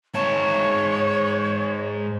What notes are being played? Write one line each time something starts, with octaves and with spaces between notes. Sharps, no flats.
G#2 C#5 A5